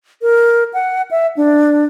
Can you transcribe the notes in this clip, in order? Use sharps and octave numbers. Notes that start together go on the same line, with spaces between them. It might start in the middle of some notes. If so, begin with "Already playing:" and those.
A#4
F#5
E5
D4